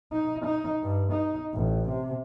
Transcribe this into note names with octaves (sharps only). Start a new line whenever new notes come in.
D#4
D#4
G2
D#4
A1
C3